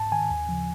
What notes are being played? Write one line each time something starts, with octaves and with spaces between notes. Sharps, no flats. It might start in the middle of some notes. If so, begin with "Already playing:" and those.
Already playing: G#2 A5
D#3 G#5
D#2
C#3 F3